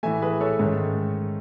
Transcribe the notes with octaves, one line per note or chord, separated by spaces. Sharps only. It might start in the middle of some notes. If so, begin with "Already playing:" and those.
A2 E3 A3 E5 G#5
G#4 B4
A4 C#5
G#2 D#3 A3 C#4